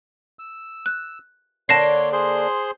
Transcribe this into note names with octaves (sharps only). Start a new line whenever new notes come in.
E6
F#6
D3 A#3 D4 C#5 A5 C6 A#6 C7
G#4 C5 C6